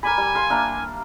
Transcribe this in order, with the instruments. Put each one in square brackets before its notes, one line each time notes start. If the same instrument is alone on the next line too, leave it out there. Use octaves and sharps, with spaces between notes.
[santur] A#4 D5 B5 [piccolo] G#5
[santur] G3
F5 C6
A#3 D4 E5